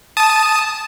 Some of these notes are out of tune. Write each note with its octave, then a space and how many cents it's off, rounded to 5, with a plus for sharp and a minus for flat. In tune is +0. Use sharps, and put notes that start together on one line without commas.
A5 -10 D#6 +0